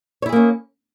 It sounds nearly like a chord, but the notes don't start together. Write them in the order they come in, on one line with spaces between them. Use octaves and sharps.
C#5 E4 G#4 A#3 C#4